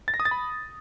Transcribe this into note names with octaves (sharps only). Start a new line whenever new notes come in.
A6
A#6
D#6
A6
B5